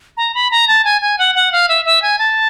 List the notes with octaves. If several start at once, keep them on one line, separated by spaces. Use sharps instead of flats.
A#5
B5
A#5
A5
G#5
G#5
F#5
F#5
F5
E5
E5
G#5
A5